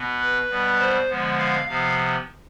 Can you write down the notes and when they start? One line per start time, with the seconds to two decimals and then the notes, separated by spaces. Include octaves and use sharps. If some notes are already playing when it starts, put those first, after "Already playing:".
Already playing: B2 B3
0.19 B4
0.50 B2 G3 B3
0.78 C5
1.09 D3 F3 G#3 B3
1.38 F5
1.67 C3 F3 B3 F5